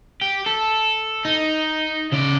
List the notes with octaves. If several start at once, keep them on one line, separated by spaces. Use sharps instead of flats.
G4
A4
D#4
C#3 D5